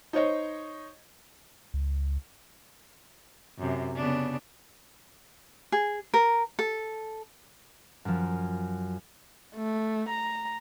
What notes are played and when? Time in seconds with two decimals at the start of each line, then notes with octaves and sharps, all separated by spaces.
0.13 D#4 C5 C#5 D#5
1.74 C#2
3.59 F#2 C3
3.96 C#3 B3 D4
5.72 G#4
6.14 A#4
6.59 A4
8.05 F#2 F3
9.56 A3
10.09 A#5